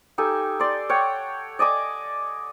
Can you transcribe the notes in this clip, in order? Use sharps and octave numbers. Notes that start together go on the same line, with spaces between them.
D#4 G4 A4 G#5
D5 C6
C#5 F#5 G5
D5 D#5 G#5 D6